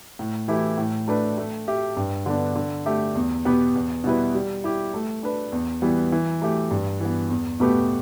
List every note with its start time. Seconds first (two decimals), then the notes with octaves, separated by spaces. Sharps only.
0.19 A2
0.48 E3 A3 E4 G4
0.78 A2
1.08 A3 D4 B4
1.38 A3
1.68 G4 E5
1.97 G2
2.26 D3 B3 D4
2.56 D3
2.86 A3 G4 E5
3.15 E2
3.45 B2 B3 G4 B4
3.75 E2
4.04 B2 G3 E4 B4
4.34 G3
4.64 E4 G4
4.94 A3
5.23 D4 B4
5.52 E2
5.82 E3 G3 B3
6.12 E3
6.42 A3 G4 E5
6.71 G2
7.00 E3 B3
7.30 E2
7.60 B2 A3 G4 B4